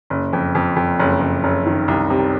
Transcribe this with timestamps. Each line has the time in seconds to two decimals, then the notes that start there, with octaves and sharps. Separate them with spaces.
0.10 F#1
0.33 F2
0.55 F2
0.76 F2
0.99 F#1
1.21 F#1
1.44 F#1
1.66 D#3
1.88 C2
2.10 C3